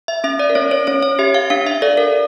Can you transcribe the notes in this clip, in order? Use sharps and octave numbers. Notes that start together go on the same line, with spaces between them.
E5
C#4 E5
D5
A#4
C#4 C#5
C#5
C#4 C#5
C#5
G4 E5
F5
D4 F5
E5
A4 D5
A#4